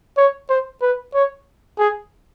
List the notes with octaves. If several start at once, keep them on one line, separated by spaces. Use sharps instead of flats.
C#5
C5
B4
C#5
G#4